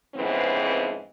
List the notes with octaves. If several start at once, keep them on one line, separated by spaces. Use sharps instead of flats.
F2 G#2 C#3 E3 B3 C4